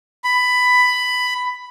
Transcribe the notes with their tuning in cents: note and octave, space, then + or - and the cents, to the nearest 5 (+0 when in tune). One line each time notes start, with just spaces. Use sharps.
B5 +10